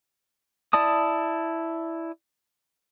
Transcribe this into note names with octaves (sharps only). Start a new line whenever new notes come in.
E4 D5 A5 D#6